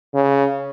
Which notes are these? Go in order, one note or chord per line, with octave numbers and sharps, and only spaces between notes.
C#3